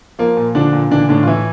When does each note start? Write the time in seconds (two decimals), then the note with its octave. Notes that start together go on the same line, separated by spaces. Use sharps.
0.19 F3 A#3
0.37 A#2
0.55 D3 F3 D4
0.73 A#2
0.91 D3 E3 D4
1.09 A2 D3 D4
1.23 F4
1.27 E3 E4